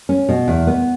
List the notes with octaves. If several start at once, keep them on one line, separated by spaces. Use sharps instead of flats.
C#4
B2
E2
B3